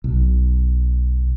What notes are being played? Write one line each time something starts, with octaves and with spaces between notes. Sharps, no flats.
B1